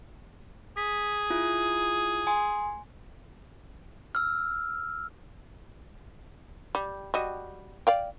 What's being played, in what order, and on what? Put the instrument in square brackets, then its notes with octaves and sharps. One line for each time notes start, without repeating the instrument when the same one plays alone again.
[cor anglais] G#4 [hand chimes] B6
[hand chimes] E4 F4
G#5 C6
[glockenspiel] E6 F6
[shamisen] G3
G3 F#4 D#5
D5 F5 G5